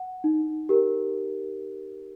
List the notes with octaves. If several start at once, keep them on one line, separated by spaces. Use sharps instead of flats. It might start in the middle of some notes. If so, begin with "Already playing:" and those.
Already playing: F#5
D#4
G4 A#4